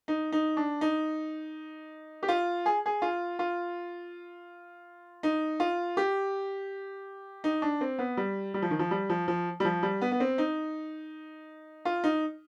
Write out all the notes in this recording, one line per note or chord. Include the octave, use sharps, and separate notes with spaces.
D#4
D#4
D4
D#4
G4
F4
G#4
G#4
F4
F4
D#4
F4
G4
D#4
D4
C4
B3
G3
G3
F3
D#3
F3
G3
F3
F3
G3
F3
G3
B3
B3
C4
D#4
F4
D#4